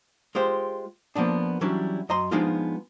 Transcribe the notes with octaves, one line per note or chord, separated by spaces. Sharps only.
G#3 F4 G4 C5
F3 A#3 B3 D4
E3 F#3 G3 C#4 D4 E4
F#2 D#5 A#5 C6
F3 G#3 B3 D4 D#4 F4